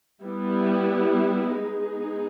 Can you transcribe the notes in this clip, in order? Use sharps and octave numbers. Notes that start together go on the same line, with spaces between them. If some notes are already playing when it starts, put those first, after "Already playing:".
G3 B3 E4 G4
G#3 B3 D#4 G#4